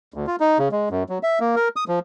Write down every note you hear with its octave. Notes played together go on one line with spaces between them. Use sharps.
D2
F4
D#4
C#3
G#3
F#2
F#3
E5
A#3
A#4
D#6
F3